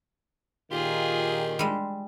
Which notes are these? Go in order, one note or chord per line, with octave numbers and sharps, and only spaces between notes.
A#2 D#3 F4 G4 G#4
G3 G#3